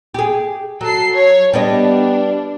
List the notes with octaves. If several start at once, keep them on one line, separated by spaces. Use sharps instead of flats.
G4 G#4
F#3 A4 C7
C#5
G3 B3 D4 D#5